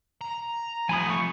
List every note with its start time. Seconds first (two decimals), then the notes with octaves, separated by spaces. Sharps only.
0.21 A#5
0.89 F2 A3 G#5 B5 D#6
1.10 C#6